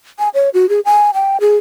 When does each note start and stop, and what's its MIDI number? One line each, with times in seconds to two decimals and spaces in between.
0.19 0.29 80
0.34 0.50 73
0.54 0.69 66
0.69 0.80 68
0.85 1.11 80
1.14 1.37 79
1.41 1.56 68